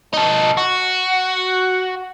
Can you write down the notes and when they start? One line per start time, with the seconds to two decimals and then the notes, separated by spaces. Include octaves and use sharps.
0.13 D#4 A4
0.57 F#4